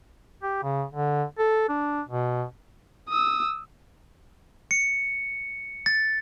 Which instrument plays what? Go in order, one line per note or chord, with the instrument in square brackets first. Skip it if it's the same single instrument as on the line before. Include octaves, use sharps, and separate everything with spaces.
[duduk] G4
C#3
D3
A4
D4
B2
[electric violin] D#6 E6
[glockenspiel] C#7
A6